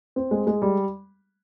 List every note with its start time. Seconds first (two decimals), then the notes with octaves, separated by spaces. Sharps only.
0.16 C4
0.31 G#3
0.47 G#3
0.62 G3